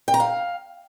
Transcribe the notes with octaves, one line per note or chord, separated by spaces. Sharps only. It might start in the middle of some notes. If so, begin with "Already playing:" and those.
G5
A#5
F5